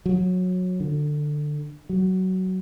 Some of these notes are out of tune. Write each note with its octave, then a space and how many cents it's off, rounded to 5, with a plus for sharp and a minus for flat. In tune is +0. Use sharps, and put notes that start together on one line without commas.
F#3 -20
D3 +15
F#3 +15